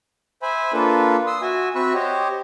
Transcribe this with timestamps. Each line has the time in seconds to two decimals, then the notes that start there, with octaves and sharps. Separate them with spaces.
0.42 C5 E5 G#5 B5
0.73 A#3 D4 F4 A4 B4
1.27 C6 D#6 E6
1.41 F#4 E5 G#5
1.75 C4 F#4 E5 B5 C#6 F#6
1.94 G4 C5 C#5 D#5